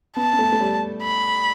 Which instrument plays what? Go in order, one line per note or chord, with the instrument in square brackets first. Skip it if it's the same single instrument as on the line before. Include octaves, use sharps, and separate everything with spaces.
[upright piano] B3 [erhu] A5
[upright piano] B3
A3
A3
G3
[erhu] B5